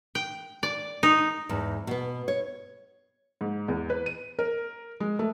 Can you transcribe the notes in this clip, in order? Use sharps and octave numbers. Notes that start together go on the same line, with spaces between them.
G5
D5
D#4
E2 G#2
B2 B3
C#5
G#2
E2
B4
D#7
A#4
G#3
A3